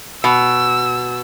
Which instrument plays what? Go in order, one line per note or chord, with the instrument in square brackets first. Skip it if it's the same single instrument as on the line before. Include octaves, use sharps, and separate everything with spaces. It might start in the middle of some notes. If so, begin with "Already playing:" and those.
[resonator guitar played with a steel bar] B2 [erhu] E6